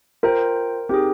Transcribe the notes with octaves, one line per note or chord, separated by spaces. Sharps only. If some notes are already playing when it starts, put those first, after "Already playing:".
F4 A#4 C5 G5
C4 D#4 G4 G#4